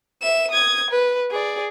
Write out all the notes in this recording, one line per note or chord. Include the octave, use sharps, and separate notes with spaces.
E5 E7
D#6 G#6
B4
G#4 D5